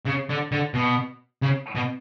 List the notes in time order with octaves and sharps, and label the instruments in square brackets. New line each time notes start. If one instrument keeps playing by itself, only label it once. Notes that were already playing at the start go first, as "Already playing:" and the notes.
[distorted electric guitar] C#3
D3
D3
B2
C#3
B2